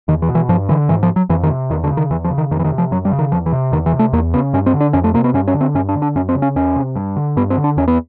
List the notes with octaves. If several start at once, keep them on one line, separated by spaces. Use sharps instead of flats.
E2 D#3
E3
B2
E3
G2 F3
D3 E3
G#2 E3
F3
F#3
F2 E3
D#3
C3
E2 D#3
D3
C#3
D#3
E2 E3
F3
C#3
D#3
F2 D#3
E3
D#3
C3
F3
F#2 F#3
G3
C#3
D#3
E2 F3
E3
C3
E2 D#3
E3
C3
A3
E2 A#3
C#3 B3
G2 C#4
C4
D3
D4
F2 C#4
A3
C3 A#3
B3
G2 C#4
C#4
D3
C4
G2 C#4
D4
D3
D4
F#2 C#4
C4
C#3
C#4
E2 C#4
C3
G2
D3
G2 B3
C4
D3
D4
E2 C#4
B3